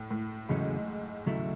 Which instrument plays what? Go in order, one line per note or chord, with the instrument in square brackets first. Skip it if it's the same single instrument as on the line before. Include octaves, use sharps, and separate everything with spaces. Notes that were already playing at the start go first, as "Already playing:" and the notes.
Already playing: [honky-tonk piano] A2
A2
[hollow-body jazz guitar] E2 C#3 F#3 A3 C#4 [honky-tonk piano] G#2
[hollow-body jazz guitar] D#2 C#3 F#3 A3 E4